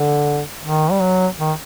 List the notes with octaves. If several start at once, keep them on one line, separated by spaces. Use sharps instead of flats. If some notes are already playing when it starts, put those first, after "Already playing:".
Already playing: D3
D#3
G3
F#3
D#3